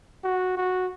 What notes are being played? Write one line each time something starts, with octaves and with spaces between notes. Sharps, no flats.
F#4
F#4